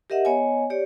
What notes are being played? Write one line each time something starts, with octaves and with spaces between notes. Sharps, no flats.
G4 A#4 D#5 E5 F#5
B3 C#5 D#5 G#5
G4 C#5 D5